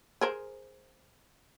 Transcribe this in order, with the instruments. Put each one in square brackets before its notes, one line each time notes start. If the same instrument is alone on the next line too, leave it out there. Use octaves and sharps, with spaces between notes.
[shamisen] G#4 A#4 C5